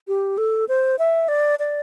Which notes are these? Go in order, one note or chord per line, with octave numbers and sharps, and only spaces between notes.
G4
A4
C5
E5
D5
D5